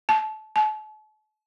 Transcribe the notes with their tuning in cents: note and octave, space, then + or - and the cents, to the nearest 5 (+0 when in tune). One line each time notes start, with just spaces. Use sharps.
A5 -25
A5 -40